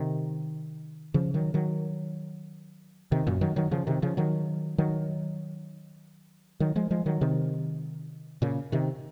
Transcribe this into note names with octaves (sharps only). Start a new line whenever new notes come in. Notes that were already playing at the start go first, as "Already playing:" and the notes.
Already playing: C3 D#3
C#3 F3
D#3 F#3
D#3 F#3
C3 D#3
F#2 A#2
D#3 F#3
D#3 F#3
C#3 F3
C3 D#3
C#3 F3
D#3 F#3
D#3 F#3
D#3 F#3
F3 G#3
F3 G#3
D#3 F#3
C3 D#3
A#2 C#3
C3 D#3